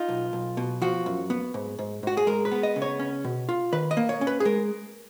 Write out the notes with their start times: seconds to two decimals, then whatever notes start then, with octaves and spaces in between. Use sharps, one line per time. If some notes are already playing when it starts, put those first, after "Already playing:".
Already playing: D#4 F4
0.09 B1
0.33 B1
0.57 B2
0.82 F3 F#4
1.06 F#2
1.30 B3
1.54 G#2
1.79 G#2
2.03 G#2 F#4
2.17 G#4
2.27 G#3 A#4
2.45 B4
2.52 B3
2.63 D#5
2.76 C#3
2.82 C#5
2.99 C#4
3.24 B2
3.49 F4
3.72 D#3 B4
3.91 D#5
3.97 A#3
4.09 C#5
4.21 C#4
4.27 B4
4.40 G#4
4.45 G#3 A#4